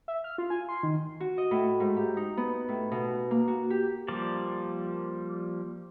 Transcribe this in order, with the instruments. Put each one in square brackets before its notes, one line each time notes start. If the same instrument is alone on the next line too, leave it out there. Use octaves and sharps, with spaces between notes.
[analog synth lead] E5
F6
F4
G#5
C6
D#3
[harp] F#4
D#5
A2
G#2
G4
D#4
B3
A2
B2
A#3
F#4
G4
[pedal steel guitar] F3 G3 A#3 D5